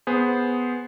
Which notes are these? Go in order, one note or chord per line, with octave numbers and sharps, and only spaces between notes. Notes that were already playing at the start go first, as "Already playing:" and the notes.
B3 G#4 C5